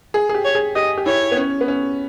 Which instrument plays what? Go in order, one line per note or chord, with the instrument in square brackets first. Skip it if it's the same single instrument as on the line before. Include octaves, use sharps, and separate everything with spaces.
[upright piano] G#4
G#4
G4
[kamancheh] C#5
[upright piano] G#4
[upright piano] G4 [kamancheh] D#5
[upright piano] G4
[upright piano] E4 [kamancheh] C#5
[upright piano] B3
C#4
B3
C#4